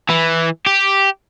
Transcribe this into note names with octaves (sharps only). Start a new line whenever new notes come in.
E3
G4